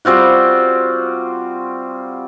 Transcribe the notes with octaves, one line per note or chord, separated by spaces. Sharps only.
G3 C4 F4 F#4